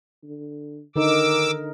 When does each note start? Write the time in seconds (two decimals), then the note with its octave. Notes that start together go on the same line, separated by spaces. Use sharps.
0.23 D3
0.96 D3 D#3 D#4 A#4 D6 E6